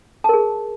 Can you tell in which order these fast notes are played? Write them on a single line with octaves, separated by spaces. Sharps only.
A5 A#4 G#4